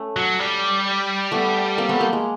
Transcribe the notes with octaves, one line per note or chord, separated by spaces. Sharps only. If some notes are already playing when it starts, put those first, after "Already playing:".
Already playing: A3 C#4
F#3
G3
A3 B3
A#3 C4
A3 B3
A#3
G#3